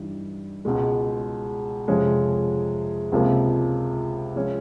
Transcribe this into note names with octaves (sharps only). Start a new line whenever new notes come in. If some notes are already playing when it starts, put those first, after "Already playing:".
Already playing: G2 E3 G3 D#4
C#2 B2 G#3
F2 C3 F3 G#3 C#4
C#2 C3 F3 A#3
F3 G#3 C#4